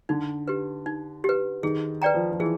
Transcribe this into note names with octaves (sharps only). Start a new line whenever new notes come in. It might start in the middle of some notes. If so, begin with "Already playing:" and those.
D3 D#4
G4 B4
D#4
G4 B4
D#3 G#4
B4 D5 G5 A#5
F3
F3
E3 G#4